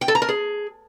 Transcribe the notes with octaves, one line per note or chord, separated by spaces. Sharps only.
G5
A4
A#5
A#4
G#4